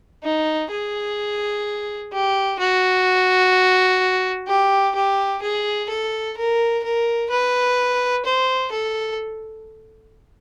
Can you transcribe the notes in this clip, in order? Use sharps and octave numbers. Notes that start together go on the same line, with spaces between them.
D#4
G#4
G4
F#4
G4
G4
G#4
A4
A#4
A#4
B4
C5
A4